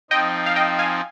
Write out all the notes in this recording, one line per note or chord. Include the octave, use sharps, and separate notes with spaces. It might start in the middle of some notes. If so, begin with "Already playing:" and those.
F3 C4 D#4 D#5 G5
F5
D#5 G5
F5 G#5